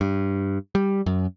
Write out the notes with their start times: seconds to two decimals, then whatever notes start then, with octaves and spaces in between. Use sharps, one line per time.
0.01 G2
0.75 G3
1.06 F#2